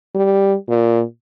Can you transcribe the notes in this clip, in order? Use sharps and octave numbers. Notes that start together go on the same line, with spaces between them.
G3
A#2